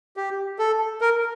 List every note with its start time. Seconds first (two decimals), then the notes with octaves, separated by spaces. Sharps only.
0.17 G4
0.59 A4
1.01 A#4